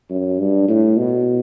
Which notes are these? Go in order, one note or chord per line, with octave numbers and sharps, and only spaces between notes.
F#2
G2
A2
B2